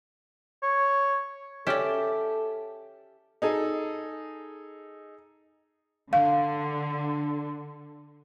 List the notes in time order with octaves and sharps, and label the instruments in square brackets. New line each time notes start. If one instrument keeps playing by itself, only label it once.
[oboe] C#5
[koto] C#4 D5 [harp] G4 E5 [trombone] A4
[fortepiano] D#4 G#4 A4
[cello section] D3 [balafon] F5